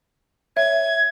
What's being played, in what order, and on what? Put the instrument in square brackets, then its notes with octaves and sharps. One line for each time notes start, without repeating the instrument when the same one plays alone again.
[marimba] C#5 E5 [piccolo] G#6